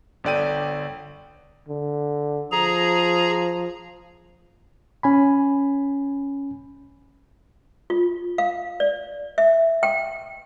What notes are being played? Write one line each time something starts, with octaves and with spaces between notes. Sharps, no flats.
G1 D3 D5 G5 D#7
D3
F3 G#4 A#5
C#4 G#5 B5
F4
F5
D5
E5
G5